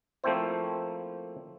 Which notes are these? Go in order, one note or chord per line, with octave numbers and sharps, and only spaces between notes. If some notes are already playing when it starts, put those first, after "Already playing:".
F3 A3 A#3 C4 E4 C5